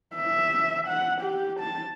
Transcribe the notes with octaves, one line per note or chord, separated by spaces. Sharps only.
E5
F#5
G4
A5